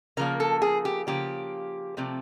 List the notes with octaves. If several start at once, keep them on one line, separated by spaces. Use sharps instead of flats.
C#3 F3 A#3 A#4
A4
G#4
G4
C#3 F3 A#3 G4
C3 F3 A3 C4